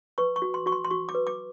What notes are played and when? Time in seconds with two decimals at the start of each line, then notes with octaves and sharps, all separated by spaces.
0.18 B4 C#6
0.36 C#6
0.42 F#4
0.54 C6
0.66 F#4 C#6
0.72 C6
0.85 C6
0.91 F#4 C#6
1.09 D6
1.15 B4
1.27 D6